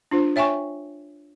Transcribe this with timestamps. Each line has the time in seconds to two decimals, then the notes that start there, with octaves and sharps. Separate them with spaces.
0.11 D4 F4 C5
0.36 C#5 E5 G5 G#5 C#6